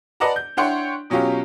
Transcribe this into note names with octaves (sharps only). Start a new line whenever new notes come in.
B4 D5 D#5 F#5 A5 A#5
G6
D4 E4 C#5 F#5 G5 C6
B2 F#3 C#4 F4 G4